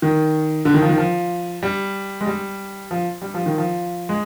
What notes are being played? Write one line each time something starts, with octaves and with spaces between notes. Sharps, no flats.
D#3
D3
D#3
F3
D#3
F3
G3
G#3
G3
F3
G3
F3
D#3
F3
G#3